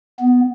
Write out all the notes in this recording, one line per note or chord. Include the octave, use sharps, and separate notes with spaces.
B3